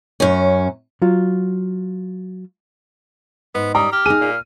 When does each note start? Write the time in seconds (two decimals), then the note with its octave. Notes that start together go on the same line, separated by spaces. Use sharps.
0.20 F#2 C#4
1.02 F#3 F4
3.55 G#2 B3
3.75 G3 A#5 D#6
3.92 G4 F6
4.06 D#4 G#4 D#7
4.21 A#2